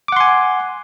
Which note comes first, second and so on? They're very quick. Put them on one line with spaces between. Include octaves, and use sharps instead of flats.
D6 F#5 C6 G#5